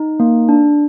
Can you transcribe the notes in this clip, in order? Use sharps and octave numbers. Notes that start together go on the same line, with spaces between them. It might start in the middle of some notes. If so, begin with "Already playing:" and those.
Already playing: D#4
A#3
D4